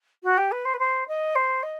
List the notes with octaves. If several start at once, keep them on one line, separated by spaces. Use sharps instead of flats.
F#4
G4
B4
C5
B4
C5
D#5
C5
D#5